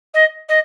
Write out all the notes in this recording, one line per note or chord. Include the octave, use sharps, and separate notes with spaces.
D#5
D#5